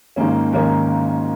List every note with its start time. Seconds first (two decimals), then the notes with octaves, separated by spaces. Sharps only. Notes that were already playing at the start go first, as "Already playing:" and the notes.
0.16 G#1 G#2 D#3 A#3 C#4
0.53 G#1 G#2 D#3 A#3 C#4 A#4